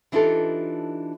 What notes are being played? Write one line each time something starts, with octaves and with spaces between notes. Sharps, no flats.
E3 D4 D#4 F4 G4 A4